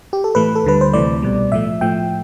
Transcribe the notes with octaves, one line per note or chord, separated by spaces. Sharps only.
G4
A4
A2 E3 A3 B4
A4
D2 D3 G3 B4
C5
D2 C3 E3 A3 D5
C2 B2 G3
A2 F3 A3 E5
A2 F3 A3 G5